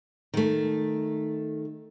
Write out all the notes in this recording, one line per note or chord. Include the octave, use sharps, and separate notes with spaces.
D#3 A3